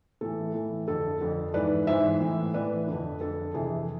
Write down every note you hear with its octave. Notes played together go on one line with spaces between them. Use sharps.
A2 E3 A4
A2 E3
F2 D3 A4
F2 D3
G#2 E3 B4 D5
G#2 E3 C5 E5
A2 E3
A2 E3 B4 D5
F2 D3
F2 D3 A4
F2 C3 E3 G#4